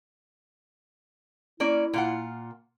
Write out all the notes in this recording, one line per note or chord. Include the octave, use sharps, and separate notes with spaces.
A#3 C#4 E4 D5
A#2 F4 F#5